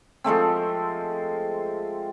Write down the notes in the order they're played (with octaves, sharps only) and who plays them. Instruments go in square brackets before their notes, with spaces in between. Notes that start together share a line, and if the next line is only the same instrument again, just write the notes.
[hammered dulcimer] F3 G#3 A3 C4